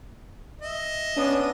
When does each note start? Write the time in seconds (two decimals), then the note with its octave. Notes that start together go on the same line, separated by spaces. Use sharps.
0.62 D#5 E5
1.17 B3 C#4 D4 D#6